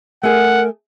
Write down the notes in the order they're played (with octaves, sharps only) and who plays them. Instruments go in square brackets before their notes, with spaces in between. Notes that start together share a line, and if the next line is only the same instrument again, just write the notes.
[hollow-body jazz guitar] A3 G#4 [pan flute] A#4 [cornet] F#5